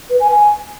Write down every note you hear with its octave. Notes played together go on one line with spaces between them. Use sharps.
B4
G#5
G#5